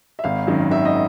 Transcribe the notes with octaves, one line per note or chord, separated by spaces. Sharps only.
E5
G#1 F5
F#2 D#3 F#3
G#1 E5
D#5